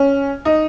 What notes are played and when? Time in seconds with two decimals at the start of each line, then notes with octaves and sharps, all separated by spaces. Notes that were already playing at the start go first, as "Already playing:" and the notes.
Already playing: C#4
0.45 D#4